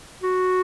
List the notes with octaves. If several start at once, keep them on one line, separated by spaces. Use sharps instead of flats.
F#4